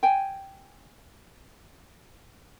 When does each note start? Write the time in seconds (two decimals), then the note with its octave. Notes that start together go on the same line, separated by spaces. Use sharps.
0.03 G5 G#5